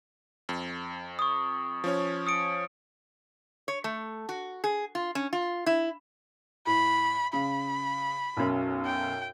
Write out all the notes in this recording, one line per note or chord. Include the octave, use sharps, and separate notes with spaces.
F2
C#6 D#6
F3 C#4 C#5
D#6 C#7 D7
C#5
A3
F#4
G#4
F4
C#4
F4
E4
A2 B5
C#3 B5
B1 F#2
G5